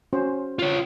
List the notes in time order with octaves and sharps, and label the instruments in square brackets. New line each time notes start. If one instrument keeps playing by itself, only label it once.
[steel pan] C#4 F#4 C5
[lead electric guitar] F4 C#5